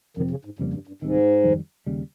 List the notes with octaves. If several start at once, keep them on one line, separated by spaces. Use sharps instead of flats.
F2 C3 D#3 F3 C4
C#3
G#2
F2 G#2 C#3 G3 A#3
G2
G2
C2 G#2 C3 D#3
F2 D#3 G3
D#2 C#3 G3